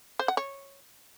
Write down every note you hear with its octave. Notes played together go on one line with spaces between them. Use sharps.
C5
F#5
C#5